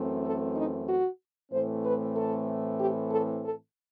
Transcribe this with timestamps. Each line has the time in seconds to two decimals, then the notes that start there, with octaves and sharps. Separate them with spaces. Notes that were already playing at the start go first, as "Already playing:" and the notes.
Already playing: F#2 E3 A3 C4
0.25 A4
0.56 D#4
0.88 F#4
1.52 A2 E3 A3 C4 C5
1.84 B4
2.16 A4
2.79 G4
3.12 A4
3.43 A4